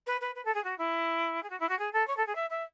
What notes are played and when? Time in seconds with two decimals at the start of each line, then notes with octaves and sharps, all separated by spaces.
0.07 B4
0.21 B4
0.35 B4
0.45 A4
0.54 G#4
0.64 F#4
0.78 E4
1.43 G#4
1.50 F#4
1.60 E4
1.69 F#4
1.79 G#4
1.93 A4
2.07 C#5
2.17 A4
2.27 G#4
2.35 E5
2.50 E5